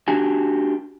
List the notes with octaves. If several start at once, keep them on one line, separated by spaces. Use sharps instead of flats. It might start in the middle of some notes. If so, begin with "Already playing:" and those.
D4 F#4 G4 G#5